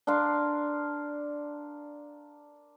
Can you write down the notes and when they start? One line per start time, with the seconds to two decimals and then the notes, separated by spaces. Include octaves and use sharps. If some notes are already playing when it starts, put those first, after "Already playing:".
0.07 D4 A#4 F5 C6